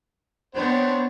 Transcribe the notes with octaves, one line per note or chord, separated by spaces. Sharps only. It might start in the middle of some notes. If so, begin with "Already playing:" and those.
B3 C4 D4 C#5